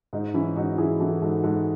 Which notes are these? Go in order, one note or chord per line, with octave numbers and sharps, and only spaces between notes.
G#2 D#4
E3 C#4 E4
G#2 D#4 F#4
E3 E4 G#4
E3 F#4 A4
G#2 F#4 A4
G#2 F#4 A4